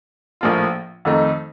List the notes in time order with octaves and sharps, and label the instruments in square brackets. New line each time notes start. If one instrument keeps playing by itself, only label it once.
[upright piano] A#1 A2 F3 A#3 F4
F2 D#3 A3 D#4